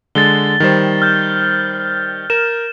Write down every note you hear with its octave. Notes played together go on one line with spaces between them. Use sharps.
D3 G#3 A6 G7
D#3 G3 C5
F6 G6
A#4 E7